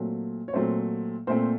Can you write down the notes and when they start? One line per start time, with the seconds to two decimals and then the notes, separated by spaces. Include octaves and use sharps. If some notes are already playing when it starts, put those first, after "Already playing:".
Already playing: A#2 F#3 A3 C4
0.48 C#5
0.53 A#2 F#3 A3 C4 C5
1.27 A#2 A3 C4 C5